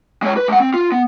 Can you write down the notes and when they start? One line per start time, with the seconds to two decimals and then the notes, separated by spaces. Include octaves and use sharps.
0.22 G#3 C#5
0.37 B4
0.48 G#3 F#5
0.60 C4
0.74 F4
0.92 B3